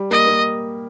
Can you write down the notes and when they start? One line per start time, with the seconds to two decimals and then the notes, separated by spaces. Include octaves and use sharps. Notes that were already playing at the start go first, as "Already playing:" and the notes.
Already playing: G3
0.11 A#3 D#5
0.27 A#3